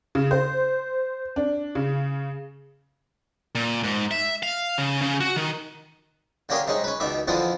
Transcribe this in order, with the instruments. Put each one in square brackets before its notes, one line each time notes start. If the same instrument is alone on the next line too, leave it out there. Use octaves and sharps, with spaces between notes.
[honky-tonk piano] C#3
C5
D4
C#3
[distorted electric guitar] A#2
G#2
E5
F5
C#3
C#3
F#4
D#3
[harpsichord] D3 A#3 C#4 G4 G#4 A#4
C3 G#3 C#4 D#4
C#4 B4
C#2 B2 D#3 D5 E5
F2 D3 E3 F3 B3 C4